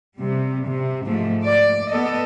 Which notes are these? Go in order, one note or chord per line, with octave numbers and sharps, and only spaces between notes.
C3 G3
C3
G#2 F3 A3
D5
B3 A4 D#5